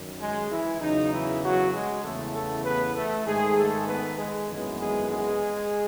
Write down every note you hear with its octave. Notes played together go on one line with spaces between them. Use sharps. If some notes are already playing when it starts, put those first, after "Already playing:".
Already playing: F#2 D#3
G#3 G#4
E3 E4
E2 C#3 F#3 D#4
E3 E4
F#3 F#4
G#3 G#4
E2 C#3 E3 A3 B3 A4
A3 A4
B3 B4
A3 A4
G#2 D#3 G#3 A3 G#4
A3 A4
B3 B4
G#3 G#4
G#1 F#2 E3 G#3 B3
G#3 G#4
G#3 G#4